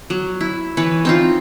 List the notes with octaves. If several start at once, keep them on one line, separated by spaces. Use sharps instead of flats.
F#3
E4
E3 B4 C#5
C4 D#4 F4